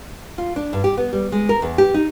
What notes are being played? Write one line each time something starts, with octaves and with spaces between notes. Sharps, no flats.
F4
D4
G2
G4
B3
G3
G#3
A#4
E2
G4
D#4